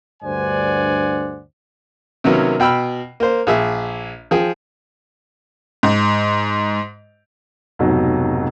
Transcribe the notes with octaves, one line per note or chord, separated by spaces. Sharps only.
D2 G2 C5 D5 F#5 G#5
C3 D#3 F#3 A#3 B3 C#4
B2 G5 B5 E6 F6
A#3 C5
A#1 G#4 E5
F3 G#4 G5
G#2
F1 G#2 B2 F#3